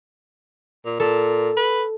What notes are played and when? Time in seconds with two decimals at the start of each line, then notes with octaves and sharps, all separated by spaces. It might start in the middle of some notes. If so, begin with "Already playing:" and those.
0.86 A#2
1.00 A#2 A4
1.57 B4